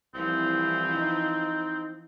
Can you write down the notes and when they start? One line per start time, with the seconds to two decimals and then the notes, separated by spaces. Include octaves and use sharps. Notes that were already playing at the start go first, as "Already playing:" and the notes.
0.15 C2 E3 F3 C4
0.95 D#4